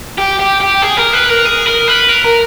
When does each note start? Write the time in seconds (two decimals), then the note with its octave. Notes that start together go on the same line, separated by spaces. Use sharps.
0.18 G4
0.39 G4
0.60 G4
0.82 G#4
0.97 A#4
1.13 B4
1.29 A#4
1.45 G#4
1.66 A#4
1.88 B4
2.09 A#4
2.24 A#4